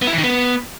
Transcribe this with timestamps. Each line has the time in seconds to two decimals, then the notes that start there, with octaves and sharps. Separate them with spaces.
0.02 B3
0.07 E4
0.13 E3
0.18 D#3
0.24 B3